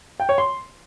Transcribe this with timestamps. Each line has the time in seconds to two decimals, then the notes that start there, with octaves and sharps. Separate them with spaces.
0.20 G5
0.29 C#5
0.38 C6